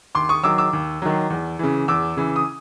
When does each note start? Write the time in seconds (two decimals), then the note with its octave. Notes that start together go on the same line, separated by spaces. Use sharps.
0.15 D#2 C6 D6
0.29 C#6 D#6
0.43 D#3 F#3 D6 E6
0.58 D6 E6
0.73 D#2
1.02 D#3 F#3
1.30 E2
1.59 C#3 E3
1.88 E2 D6 E6
2.17 C#3 E3
2.36 D#6